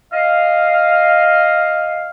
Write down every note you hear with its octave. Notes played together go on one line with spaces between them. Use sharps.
D#5 F5